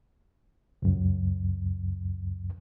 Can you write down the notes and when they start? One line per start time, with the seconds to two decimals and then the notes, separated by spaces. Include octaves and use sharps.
0.82 C#2 F#2